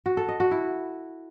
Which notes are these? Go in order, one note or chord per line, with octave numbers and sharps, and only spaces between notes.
F#4
A4
D#5
F#4
E4